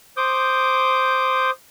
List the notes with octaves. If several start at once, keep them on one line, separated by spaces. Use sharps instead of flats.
C5 D6 D#6 G6